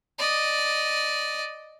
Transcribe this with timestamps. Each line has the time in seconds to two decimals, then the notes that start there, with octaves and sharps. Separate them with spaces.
0.18 D5 D#5